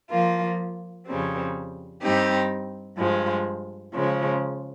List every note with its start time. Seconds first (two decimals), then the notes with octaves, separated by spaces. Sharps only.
0.10 F3 A#3 F4
1.06 F2 C#3 G3 C4
2.01 G2 G3 C4 D#4 G4
2.97 G2 F3 G#3
3.93 C#3 F3 G#3